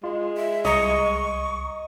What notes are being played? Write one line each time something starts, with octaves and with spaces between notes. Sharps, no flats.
G#3 F4
E5
C2 D#5 A#5 C#6 C#7